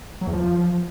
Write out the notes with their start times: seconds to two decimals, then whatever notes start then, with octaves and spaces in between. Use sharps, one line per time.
0.21 F#3
0.27 E2
0.33 F3